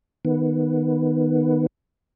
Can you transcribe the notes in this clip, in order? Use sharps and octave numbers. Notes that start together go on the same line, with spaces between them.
D#3 B3